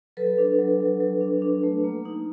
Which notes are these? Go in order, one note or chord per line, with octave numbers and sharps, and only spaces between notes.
F#3 A4 B4
D4
F#3
F#3
F#3
D4
D4
A3
A#3
D#4